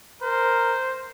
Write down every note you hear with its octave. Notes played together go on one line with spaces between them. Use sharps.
A#4 C5